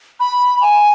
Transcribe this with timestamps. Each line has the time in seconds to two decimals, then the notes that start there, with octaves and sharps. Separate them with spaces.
0.20 B5
0.61 G#5